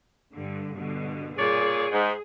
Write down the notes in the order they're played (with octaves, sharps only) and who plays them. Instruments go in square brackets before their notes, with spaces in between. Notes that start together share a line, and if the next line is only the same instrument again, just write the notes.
[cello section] G2 D3
G2 B2 D3
[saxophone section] A#2 C#5 D5 [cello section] G#4
[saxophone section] G#2